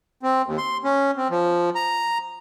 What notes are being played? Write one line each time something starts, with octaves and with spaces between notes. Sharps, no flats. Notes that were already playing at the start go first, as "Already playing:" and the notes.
C4
D#2
C6
C#4
C4
F3
A#5